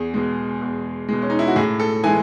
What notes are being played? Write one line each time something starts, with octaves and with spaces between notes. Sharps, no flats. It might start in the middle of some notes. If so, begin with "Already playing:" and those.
Already playing: E2 G#4
B2 G#3
E2
B2 G#3
C#4
D#4
E4
F#4
A2 G#4
A4
E3 G#3 G#5